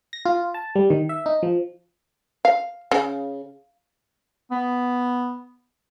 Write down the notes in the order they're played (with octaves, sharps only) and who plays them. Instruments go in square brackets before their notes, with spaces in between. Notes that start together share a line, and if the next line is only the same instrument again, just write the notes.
[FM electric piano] A#6
F4
A5
G3
D#3
E5
D#4
F3
[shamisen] F5
C#3
[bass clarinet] B3